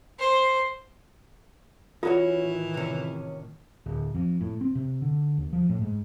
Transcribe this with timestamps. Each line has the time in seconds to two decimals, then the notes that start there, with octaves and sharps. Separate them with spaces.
0.20 C5
2.03 E3 C#4 F4 F#4 C#5
2.40 A2 D#3
2.74 C3 C#4
3.86 D1
4.15 F2
4.41 A2
4.61 C4
4.75 C3
5.02 D3
5.38 D#2
5.53 F3
5.69 A2
5.82 G#2